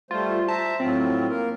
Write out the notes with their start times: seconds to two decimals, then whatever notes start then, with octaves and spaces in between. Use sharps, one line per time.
0.11 G3 A3 F4 C5
0.48 C5 E5 A5 A#5
0.80 A2 F#3 C4 F4
1.29 A#3 A#4